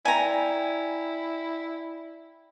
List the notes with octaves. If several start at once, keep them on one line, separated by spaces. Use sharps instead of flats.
E4 D5 G5 G#5 A#5